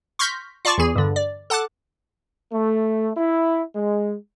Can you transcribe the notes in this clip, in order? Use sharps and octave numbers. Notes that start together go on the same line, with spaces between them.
C6 C#6 F6 G6 A#6 B6
F4 D5 A5 C#6 D6
E2 E3 G#4
G2 D3
D5
A4 F#5 A5 D6 F#6
A3
E4
G#3